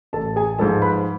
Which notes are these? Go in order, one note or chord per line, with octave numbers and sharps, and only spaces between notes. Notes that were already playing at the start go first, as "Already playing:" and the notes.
A1 A4 A5
G#4 G#5
G#2 F3 G#3 A4 A5
B4 B5